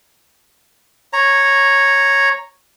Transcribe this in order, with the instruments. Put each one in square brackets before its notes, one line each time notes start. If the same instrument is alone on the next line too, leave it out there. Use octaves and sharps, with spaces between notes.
[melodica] C#5 A#5